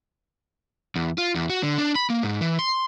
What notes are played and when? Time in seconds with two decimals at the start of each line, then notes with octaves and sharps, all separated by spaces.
0.96 E2
1.18 F4
1.35 E2
1.50 F#4
1.63 D3
1.78 D4
1.95 B5
2.10 A#3
2.23 G#2
2.41 E3
2.59 C6